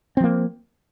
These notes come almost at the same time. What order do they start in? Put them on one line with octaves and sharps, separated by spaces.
C4 F3 A#3